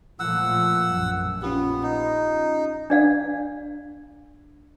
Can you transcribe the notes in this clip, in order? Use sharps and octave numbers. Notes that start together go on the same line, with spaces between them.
A#2 F3 A3 F#5 A#5 E6
A#1 F#2
B3 C#4 F4 G4
D#4
D4 D5 F5